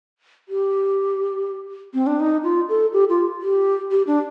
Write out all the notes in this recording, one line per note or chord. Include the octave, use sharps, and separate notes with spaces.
G4
C4
D4
D#4
F4
A4
G4
F4
G4
G4
D4